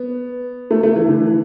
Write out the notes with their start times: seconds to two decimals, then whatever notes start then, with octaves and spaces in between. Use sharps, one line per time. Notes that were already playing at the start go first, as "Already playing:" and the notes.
Already playing: B3
0.71 A3
0.83 A3
0.95 E3
1.08 D3
1.20 E3